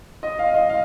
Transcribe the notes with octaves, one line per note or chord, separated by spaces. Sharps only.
D#5
F5
D#5
F5